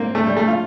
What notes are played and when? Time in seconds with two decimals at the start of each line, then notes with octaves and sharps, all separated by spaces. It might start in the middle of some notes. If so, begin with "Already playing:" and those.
Already playing: A#3 C4
0.15 A3
0.26 G3
0.37 A3
0.48 F4